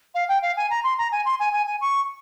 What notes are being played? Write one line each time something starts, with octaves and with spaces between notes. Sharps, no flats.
F5
G5
F5
G#5
A#5
C6
A#5
G#5
C6
G#5
G#5
G#5
C#6